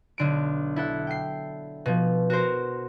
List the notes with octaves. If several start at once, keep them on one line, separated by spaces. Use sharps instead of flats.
B1 D3 D7
E4 A4 F#5
G5 C7
B2 F3
F#4 A#4 C5